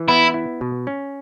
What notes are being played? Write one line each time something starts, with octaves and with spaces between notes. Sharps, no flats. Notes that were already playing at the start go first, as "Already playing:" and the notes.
Already playing: E3
B3 E4
E4
B2
C#4